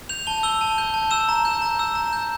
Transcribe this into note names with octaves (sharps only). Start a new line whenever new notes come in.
G6 F7
A5 G7
E6 G7
A5
G6
A5
E6 E7
A#5
G6
A#5
E6
A#5
G6